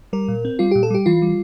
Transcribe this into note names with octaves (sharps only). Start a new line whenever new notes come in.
G3 A#4
A#2
C4
G3 F4
A#2 G4
A4
G3 G4
E3 F4
G3